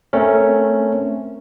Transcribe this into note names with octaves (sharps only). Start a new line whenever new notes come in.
A3 C4 C#4 A#4